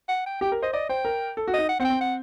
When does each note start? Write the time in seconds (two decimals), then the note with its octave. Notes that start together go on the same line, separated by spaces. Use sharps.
0.09 F#5
0.26 G5
0.41 G4 G5
0.52 A#4
0.62 C5 D#5
0.73 D5 D#5
0.89 C5 G5
1.05 A#4
1.37 A4
1.48 F#4
1.54 D#4 D#5
1.69 F#5
1.80 C4 F#5
1.84 G5
1.90 C4
2.01 F#5